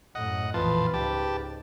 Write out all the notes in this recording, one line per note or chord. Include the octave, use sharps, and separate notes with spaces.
F#2 A2 D#5 F#5
A#1 F2 E3 F4 B4 A5
C#2 G#2 G4 A5